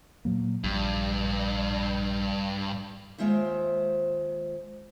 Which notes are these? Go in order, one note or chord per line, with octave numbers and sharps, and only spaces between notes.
A#2 F#3 A#3
A#1 G2
D#2 F3 G#3 F4 C5 E5